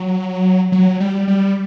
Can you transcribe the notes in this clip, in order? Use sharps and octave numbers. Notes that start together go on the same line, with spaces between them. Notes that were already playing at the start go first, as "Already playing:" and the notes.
Already playing: F#3
F#3
G3
G3